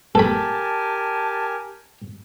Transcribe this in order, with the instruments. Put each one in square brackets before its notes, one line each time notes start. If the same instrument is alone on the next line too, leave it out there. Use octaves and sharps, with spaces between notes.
[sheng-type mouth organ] G4 A#4 G#5 [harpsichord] A4 B5 [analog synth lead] A5